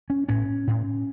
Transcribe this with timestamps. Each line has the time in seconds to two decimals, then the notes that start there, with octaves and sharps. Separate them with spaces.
0.10 C#4
0.29 A2 C#4
0.67 A2